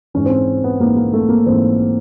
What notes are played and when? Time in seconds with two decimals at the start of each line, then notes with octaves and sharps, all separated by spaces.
0.14 G#2 E3 C#4
0.26 C4
0.30 C#4
0.64 B3
0.80 G#2 E3 A#3
0.97 A#3
1.13 A3
1.29 A#3
1.46 G#2 E3 C4